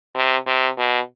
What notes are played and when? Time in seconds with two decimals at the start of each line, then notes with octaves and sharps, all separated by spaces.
0.15 C3
0.47 C3
0.78 B2